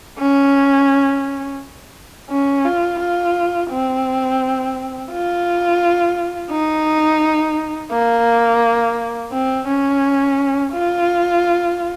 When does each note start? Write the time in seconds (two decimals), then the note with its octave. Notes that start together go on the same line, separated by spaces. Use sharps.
0.19 C#4
2.30 C#4
2.65 F4
3.00 F4
3.70 C4
5.11 F4
6.51 D#4
7.91 A#3
9.32 C4
9.68 C#4
10.73 F4